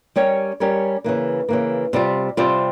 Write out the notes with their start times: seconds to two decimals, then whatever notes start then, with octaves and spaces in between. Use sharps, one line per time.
0.16 G3 C#4 G4 A#4 C#5
0.60 G3 C#4 G4 A#4 C#5
1.04 C#3 E3 A#3
1.49 C#3 E3 A#3
1.93 C3 G3 C4 F4
2.37 C3 G3 C4 F4